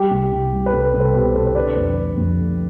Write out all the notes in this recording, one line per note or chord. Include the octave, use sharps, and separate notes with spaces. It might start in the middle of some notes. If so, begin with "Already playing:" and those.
Already playing: G3 G4
C2
C2
G3
B4
C2 A4
C2
A4 C5
B2 G4 B4
B2 A4 C5
C5
D3 B4 D5
F2
A3
F2
A3